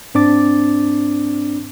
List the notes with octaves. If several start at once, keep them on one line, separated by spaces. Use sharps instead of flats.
G#2 C4 D4 D6 A6